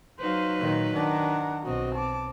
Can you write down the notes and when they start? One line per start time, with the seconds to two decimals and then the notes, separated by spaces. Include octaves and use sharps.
0.20 F#3 D#4 B4 C5 F5
0.58 A#2 D#3
0.93 D#3 D4 F#5 A#5
1.66 B1 C4 F#4 D#5
1.95 A5 D6